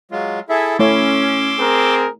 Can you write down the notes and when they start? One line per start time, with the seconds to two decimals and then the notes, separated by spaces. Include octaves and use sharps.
0.11 F#3 G#3 F4
0.49 E4 G#4 A4 E5 G#5
0.79 A3 C#4 E4 C#5 C6 D6 E6
1.60 C4 G#4 A#4